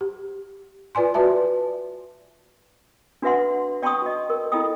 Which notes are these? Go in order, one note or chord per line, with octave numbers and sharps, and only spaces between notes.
G4
F4 B4 D5 G#5 C6
F#4 B4 D5 E5 A5
D4 F#4 B4 E5 F#5 C6
D5 G5 A5 C6 C#6 D#6
F#4 D#5
A#4
E4 F4 A4 D#5 G5 D#6